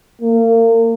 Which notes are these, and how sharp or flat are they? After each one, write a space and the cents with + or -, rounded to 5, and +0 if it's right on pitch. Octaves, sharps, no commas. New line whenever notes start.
A#3 -35